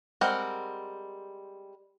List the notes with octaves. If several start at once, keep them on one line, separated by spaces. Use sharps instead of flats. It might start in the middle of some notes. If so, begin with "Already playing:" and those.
G3 G#3 C4 A#4 F#5